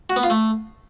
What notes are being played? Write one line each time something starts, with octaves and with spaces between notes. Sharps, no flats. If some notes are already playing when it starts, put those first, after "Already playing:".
F#4
B3
F4
A3